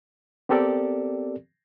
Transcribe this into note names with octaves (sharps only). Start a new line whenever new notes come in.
B3 C4 G4 A4 A#4 D5